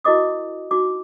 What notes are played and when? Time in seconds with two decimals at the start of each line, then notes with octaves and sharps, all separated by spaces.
0.04 E4 F#4 A#4 D#5 D6 D#6
0.71 D#4 F#4 D6